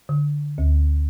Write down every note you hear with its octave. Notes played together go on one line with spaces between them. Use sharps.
D3
D2